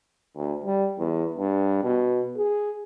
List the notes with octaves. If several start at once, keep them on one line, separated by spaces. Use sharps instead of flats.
D2
G3
E2
G2
B2
G#4